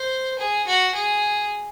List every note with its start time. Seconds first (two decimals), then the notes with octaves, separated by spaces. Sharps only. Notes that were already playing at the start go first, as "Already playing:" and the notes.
Already playing: C5
0.39 G#4
0.67 F#4
0.95 G#4